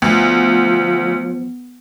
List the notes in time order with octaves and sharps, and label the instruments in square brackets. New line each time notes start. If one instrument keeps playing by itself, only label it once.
[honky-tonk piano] D2 [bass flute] F3 [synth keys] B3